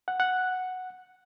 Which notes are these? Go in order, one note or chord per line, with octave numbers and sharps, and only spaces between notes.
F#5
F#5